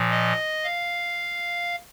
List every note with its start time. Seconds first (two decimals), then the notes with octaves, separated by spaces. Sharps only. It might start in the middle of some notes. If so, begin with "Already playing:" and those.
Already playing: A#2 F3
0.11 D#5
0.64 F5